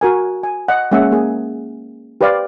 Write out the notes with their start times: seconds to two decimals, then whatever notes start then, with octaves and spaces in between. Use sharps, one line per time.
0.01 F#4 A#4 G#5
0.43 G#5
0.68 D#5 F#5
0.91 G#3 A#3 C#4 G#4 E5 F#5
1.11 A#3 G#4
2.21 G4 B4 C5 D5 F5